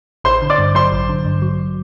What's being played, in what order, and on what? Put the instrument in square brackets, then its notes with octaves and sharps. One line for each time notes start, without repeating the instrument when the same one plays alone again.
[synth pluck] A1 [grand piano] C5 C6
[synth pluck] D3
[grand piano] D5 D6
[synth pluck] G2
[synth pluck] F#3 [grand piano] C5 C6
[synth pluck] A1
D3
G2
F#3